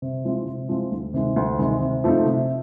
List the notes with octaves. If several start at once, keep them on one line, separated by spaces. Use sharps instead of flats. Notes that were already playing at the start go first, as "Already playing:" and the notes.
C3
F3 G#3 C4 E4
C3
F3 G#3 C4 E4
D2
C3 D#3 G#3
D2
C3 D#3 G#3
C3
F3 A3 C4 D#4
C3